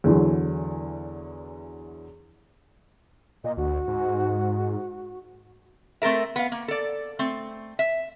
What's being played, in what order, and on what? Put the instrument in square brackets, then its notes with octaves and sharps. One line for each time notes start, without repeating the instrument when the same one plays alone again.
[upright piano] E2 D3 E3 F#3
[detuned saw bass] A#2 [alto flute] D#5
[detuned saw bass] D2 [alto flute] F#4
[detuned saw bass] G#2
[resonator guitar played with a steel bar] A3 C4 A4 A#4 E5
B3 F5
A#3
A4 D5
A3 C4
E5